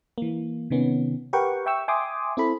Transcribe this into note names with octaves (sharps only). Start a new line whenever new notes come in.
E3 A#3
C3 D#3 B3 C#4
G4 A#4 B4 F#5 G5 C#6
E5 G5 C#6 E6
E5 G5 G#5 C6 D6 D#6
C4 E4 A4 B5